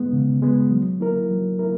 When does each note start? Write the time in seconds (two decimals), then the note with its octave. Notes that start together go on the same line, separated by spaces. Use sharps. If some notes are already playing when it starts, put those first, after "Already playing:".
Already playing: G#3 B3
0.13 C#3
0.42 G#3 B3
0.71 F#3
1.00 A#3 E4 A#4
1.30 F#3
1.59 A#3 E4 A#4